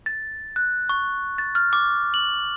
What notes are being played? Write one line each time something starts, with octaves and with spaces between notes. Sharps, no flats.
A6
F#6
C#6
A6
F6
D6
F#7